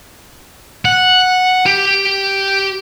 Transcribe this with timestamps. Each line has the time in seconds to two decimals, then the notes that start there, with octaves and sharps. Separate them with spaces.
0.85 F#5
1.66 G4